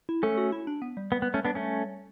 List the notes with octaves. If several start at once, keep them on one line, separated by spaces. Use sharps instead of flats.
E4
A3 C#4 A4
F#4
E4
D4
B3
G3
B3
B3
A3 C#4
B3 D4
A3 C#4